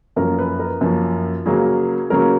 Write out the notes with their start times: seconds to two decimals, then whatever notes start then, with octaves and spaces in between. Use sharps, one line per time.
0.16 F#2 F3 A#3 C#4 A#4
0.39 B4
0.59 A#4
0.81 F#2 F3 A#3 C#4
1.46 C#3 F#3 A#3 C#4 G#4
2.10 C#3 F#3 A#3 C#4 A#4